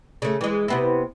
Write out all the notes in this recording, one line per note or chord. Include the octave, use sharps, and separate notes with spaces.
C#3 A3
E3 G#3
C3 B3 E4